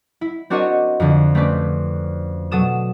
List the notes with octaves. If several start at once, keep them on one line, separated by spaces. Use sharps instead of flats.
E4
C4 D4 F#4 A#4 C#5 D#5
F2 D3
A3 C4 C#4 B4 D5
B2 F#3 A4 D#6 E7